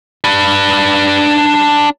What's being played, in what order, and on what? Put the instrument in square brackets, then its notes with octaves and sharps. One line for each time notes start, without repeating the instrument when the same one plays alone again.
[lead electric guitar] D4 B4